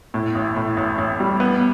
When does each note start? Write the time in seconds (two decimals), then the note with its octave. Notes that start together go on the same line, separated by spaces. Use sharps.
0.14 A2
0.35 A1
0.56 A2
0.77 A1
0.98 A1
1.20 G3
1.40 B3